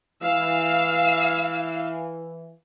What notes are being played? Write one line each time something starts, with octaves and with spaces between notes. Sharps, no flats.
E3 F5 E6